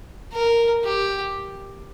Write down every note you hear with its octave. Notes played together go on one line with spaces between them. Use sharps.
A#4
G4